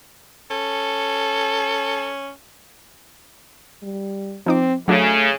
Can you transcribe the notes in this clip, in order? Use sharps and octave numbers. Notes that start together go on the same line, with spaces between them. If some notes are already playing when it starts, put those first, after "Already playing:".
C#4 A4
G3
F3 C4 D#4 D6
C#3 F#3 A3 D4 F#4